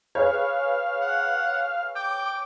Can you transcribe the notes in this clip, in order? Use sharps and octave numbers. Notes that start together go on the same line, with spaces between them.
G#4 B4 C#5 F5
F#5
G5 D6